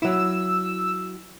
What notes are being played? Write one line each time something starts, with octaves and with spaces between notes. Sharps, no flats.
F#3 E4 E6